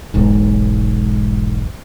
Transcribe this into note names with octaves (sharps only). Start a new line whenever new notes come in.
E1 B1 G#2